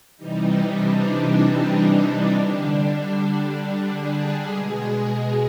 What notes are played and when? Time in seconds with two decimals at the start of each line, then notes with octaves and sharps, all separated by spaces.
0.17 C3 E3 G3 D#4
0.71 D4
2.32 D3 G3 D4
3.92 G#4
4.47 B2 G#3